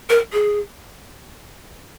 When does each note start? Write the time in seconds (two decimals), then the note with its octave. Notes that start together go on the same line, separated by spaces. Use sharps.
0.10 A#4
0.33 G#4